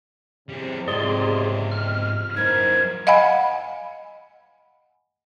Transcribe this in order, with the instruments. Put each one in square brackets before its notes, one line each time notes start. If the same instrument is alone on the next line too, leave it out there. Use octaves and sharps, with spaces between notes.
[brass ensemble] E2 A2 C3 [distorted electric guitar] G3 G#4
[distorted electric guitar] G#2 F4 [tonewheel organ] G#4 D5 C6 [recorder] D#5
[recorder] D#5 [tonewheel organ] F6
[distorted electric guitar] F#2 E4 [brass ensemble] D#4 A#4 C5 [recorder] G#6
[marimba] D#5 F5 F#5 G#5 B5